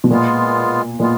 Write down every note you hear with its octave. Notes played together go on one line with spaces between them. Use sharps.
B2
A#2 G#3 B3 F4
A#2 G#3 B3 F4